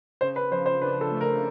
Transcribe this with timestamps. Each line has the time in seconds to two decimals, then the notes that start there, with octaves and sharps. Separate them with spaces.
0.21 C#3 C5
0.36 B4
0.51 F3 C5
0.66 C5
0.81 D4 B4
1.01 A4
1.11 A3
1.21 A#4